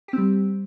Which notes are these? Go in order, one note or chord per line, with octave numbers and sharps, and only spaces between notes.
G3 C4 G4